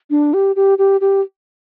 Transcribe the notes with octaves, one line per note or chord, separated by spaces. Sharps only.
D4
G4
G4
G4
G4